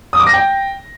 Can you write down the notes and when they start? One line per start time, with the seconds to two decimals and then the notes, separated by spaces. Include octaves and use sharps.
0.13 D#6
0.20 D6
0.27 A#6
0.33 G5